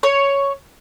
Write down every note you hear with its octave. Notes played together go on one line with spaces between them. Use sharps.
C#5